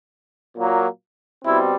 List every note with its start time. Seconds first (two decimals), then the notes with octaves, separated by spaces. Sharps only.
0.56 A#2 F#3 A#3
1.44 B2 G3 C4 E4